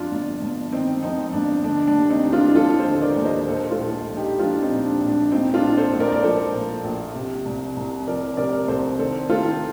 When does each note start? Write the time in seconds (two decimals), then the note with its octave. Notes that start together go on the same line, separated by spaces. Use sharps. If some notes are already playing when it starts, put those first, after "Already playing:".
Already playing: F2 D4 F4
0.11 G1
0.42 G1
0.72 D#3 C4 D#4
1.03 F2 C4 D#4
1.33 G1 D4
1.64 D3 D4
1.87 D4
1.94 D#2
2.10 C4 D#4
2.25 D#2
2.33 D4 F4
2.55 F3 F4 A4
2.79 A4 C5
2.86 D3
3.02 A#4 D5
3.16 D#2
3.24 C5 D#5
3.47 A#2 A4 C5
3.71 F4 A4
3.78 A#1
4.09 A#1
4.16 D#4 G4
4.39 F3 D4 F4
4.62 C4 D#4
4.70 A#2
4.86 D4
5.01 A#1
5.09 D4
5.31 A#2 C4 D#4
5.54 D4 F4
5.63 A#1
5.77 A4 C5
5.93 A#1
6.00 A#4 D5
6.12 D5
6.23 F3 A4 C5
6.54 A#2
6.84 A#1
7.15 C3
7.45 C2
7.77 C2
8.07 F3 A#4 D5
8.37 C3 A#4 D5
8.68 C2 A4 C5
8.99 D#3 A4 C5
9.29 D#3 F4 A4